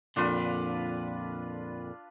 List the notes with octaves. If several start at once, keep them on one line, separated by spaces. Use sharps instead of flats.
F2 A#2 D3 D4 F4 B4